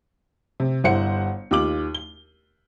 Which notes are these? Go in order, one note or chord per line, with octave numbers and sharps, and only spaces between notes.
C3
G1 E4 C5 F#5 C#7
D#2 F4 D6 F#7
G7